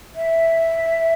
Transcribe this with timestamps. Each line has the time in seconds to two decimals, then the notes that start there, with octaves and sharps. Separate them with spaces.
0.15 E5